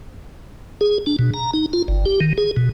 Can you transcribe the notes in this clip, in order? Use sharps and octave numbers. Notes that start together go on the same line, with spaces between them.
G#4
D4
B2
A#5
D#4
F4
G1
G4
D#3
G#4
B2